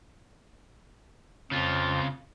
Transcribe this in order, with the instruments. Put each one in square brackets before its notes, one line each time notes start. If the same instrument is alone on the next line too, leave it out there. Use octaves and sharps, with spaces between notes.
[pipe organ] F2 G6 [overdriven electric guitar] C#3 F4